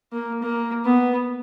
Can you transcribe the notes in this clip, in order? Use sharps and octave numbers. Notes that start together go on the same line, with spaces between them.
A#3
A#3
B3